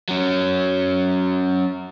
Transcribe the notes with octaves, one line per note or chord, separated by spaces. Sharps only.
F#3 C#4